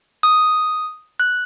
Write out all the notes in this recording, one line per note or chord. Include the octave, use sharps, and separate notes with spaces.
D#6
F#6